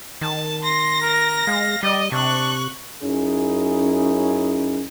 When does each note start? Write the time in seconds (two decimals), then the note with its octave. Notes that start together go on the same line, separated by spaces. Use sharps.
0.21 D#3 A5
0.64 C6 A#6
1.02 A#4
1.47 G#3 F5
1.83 G3 D5 D#5
2.12 C3 D4 C#6 F#6
3.03 F#2 C#4 D#4 E4 G#4